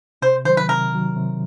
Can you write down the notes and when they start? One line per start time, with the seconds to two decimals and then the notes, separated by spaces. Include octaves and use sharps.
0.22 C3 C5
0.45 D#3 F#3 C5
0.57 B4
0.68 C3 A#4
0.93 D#3 F#3
1.16 C3